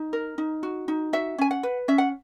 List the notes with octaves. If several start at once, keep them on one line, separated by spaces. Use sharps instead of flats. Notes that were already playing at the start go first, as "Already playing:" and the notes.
Already playing: D#4
A#4
D#4
F#4
D#4
F#4 E5
C#4 G#5
F#5
B4
C#4 E5
F#5